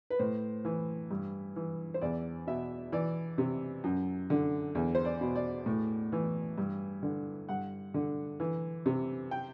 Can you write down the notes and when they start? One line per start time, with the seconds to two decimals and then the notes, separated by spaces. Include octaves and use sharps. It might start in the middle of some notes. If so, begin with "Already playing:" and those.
0.10 B4
0.19 A2 C5
0.65 E3
1.11 G2
1.56 E3
1.94 C5
2.01 E2 D5
2.47 B2 E5
2.92 E3 D5
3.38 C3
3.84 F#2
4.30 D3
4.75 E2
4.95 C5
5.05 D5
5.21 B2
5.36 D5
5.66 A2
6.12 E3
6.58 G2
7.03 D3
7.49 G2 F#5
7.94 D3
8.40 E3
8.86 C3
9.31 G5